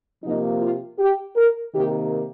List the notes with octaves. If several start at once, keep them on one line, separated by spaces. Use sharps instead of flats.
C3 F3 A#3 D#4
F4
G4
A#4
C3 D#3 A#3 G4